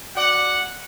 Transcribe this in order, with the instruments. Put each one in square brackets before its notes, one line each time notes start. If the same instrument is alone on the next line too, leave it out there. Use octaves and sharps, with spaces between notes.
[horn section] F#4 D5 F#5